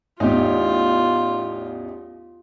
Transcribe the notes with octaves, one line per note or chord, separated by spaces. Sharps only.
A1 E2 D#4 F4 G4